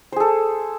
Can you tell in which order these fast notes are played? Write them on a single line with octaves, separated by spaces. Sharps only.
C5 G#4 A4